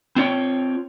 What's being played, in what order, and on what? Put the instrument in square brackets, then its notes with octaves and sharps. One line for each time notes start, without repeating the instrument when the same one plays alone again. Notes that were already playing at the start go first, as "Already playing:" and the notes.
[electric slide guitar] C4 F4 C#5 G5